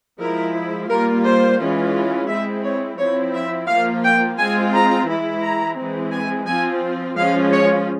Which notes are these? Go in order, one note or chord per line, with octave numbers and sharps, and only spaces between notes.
F3 G#3 E4 A#4
G3 A#3 F4 A#4
C5
E3 G#3 C#4 F4
G#3 C4 E4 E5
C#5
F3 C4 E4 C#5
E5
F3 A#3 F4 F5
G5
G#3 C4 F4 G#5
A#5
E3 G#3 E4
A#5
E3 G#3 C4
G#5
F3 C4 F4 G#5
F3 G#3 C#4 F4 F5
C#5